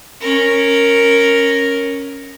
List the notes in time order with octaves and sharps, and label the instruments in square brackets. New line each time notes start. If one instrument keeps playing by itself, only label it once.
[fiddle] C#4 A#4